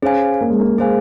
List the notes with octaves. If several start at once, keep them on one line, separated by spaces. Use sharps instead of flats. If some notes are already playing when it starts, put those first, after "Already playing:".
C#4 G#4 C5 F5 G#5
A#3
G#3
A#3
G#3 G#4 C5 F5 G#5